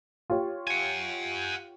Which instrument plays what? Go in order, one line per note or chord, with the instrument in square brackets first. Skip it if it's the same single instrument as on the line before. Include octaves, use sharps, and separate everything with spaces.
[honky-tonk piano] F4 G4 C#5
[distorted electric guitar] F#5 G#5